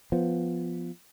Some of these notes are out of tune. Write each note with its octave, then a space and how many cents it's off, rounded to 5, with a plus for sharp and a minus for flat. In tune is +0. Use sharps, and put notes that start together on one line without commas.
F3 -5 B3 +0